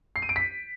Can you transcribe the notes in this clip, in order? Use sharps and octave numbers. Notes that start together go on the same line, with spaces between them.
C7
D#7
D7
B6